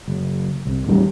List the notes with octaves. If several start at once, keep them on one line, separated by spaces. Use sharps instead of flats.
F#1
C2 C3
A1 D#2 D#3 G3